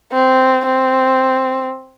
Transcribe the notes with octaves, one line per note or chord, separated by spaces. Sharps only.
C4
C4